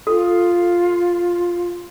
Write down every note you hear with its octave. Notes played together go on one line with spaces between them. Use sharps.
F4 A4